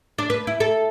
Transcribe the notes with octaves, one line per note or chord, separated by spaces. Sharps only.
D4
B4
E4
A4